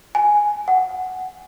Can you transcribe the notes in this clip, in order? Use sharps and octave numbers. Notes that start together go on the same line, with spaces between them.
G#5
F#5